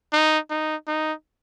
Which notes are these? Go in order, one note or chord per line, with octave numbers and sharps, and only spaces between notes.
D#4
D#4
D#4